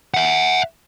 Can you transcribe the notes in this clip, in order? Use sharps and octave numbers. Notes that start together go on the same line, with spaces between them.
E5 F#5